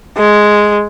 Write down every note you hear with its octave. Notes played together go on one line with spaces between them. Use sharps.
G#3